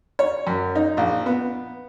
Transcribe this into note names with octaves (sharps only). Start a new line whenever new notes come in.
C#5
F#2
D#4
A#1
B3